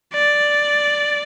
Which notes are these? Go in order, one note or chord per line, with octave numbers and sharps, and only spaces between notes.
D5